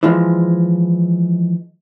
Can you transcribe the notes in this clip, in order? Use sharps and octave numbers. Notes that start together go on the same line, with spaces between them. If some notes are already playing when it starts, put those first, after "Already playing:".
E3 F3 G#3